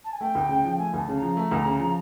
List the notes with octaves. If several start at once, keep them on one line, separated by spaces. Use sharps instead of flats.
A5
G#5
A3 G5
D2
C#3
F3
A3 G#5
D2 A5
C#3
F3 A#5
A3
D2
C#3
F3